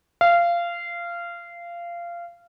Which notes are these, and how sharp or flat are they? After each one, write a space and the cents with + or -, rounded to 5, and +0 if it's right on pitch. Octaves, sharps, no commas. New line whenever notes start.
F5 -20